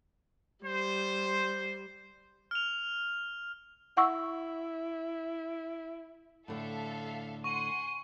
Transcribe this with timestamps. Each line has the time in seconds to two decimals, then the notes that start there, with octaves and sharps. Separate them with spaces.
0.65 G3 C5
2.51 F6 F7
3.97 E4 F#5 C#6 E6
6.48 A2 D3 A4 E5 F5
7.44 F#5 G#5 C6 C#6 D#7